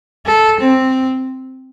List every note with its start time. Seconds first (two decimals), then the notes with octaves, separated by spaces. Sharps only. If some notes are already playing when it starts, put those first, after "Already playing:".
0.26 A4
0.60 C4